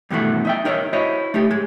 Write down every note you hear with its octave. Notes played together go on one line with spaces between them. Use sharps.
G2 B2 D#3 E3 A3 F#4
D#4 E5 G5
D#4 A#4 C#5 D#5 E5
E4 F#4 C5 C#5 D#5
A3 D#4 G4
G#2 G#3